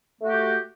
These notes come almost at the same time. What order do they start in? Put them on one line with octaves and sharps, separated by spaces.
A3 F#4 G4